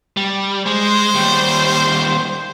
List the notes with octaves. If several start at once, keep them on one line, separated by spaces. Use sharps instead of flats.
G3
G#3 C5
D#2 G3